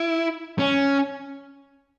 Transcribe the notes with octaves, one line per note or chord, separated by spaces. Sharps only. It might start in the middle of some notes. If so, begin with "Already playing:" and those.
Already playing: E4
C#4